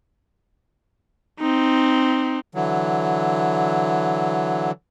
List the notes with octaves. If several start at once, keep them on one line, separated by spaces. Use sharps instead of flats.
C4 D#4
D3 E3 F#3